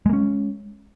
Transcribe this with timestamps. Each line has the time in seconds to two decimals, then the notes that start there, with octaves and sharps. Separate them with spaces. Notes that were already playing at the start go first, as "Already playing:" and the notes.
0.06 G#3
0.09 A#3
0.13 C#4